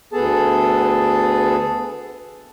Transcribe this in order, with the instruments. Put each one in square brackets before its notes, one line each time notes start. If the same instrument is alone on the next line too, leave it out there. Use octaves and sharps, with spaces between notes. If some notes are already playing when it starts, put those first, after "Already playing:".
[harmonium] D2 B3 G#4 A4 A5